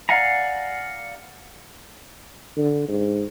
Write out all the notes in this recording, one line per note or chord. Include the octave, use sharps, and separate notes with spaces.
D5 F5 F#5 G#5 A#5
D3
G#2